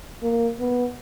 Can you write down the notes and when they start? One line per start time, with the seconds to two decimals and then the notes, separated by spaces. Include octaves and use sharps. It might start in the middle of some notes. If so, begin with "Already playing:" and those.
0.23 A#3
0.60 B3